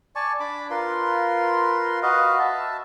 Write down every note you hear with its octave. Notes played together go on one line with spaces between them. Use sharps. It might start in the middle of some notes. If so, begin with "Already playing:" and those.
D5 G#5 A5 C#6
D4 B5 D6
F4 A#4 B4 C6
F#4 B4 D#5 F5
E5 A5